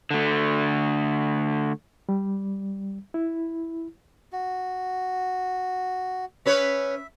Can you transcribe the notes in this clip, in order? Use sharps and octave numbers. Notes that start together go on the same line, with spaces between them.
D3 A3
G3
E4
F#4
C#4 B4 C#5 E5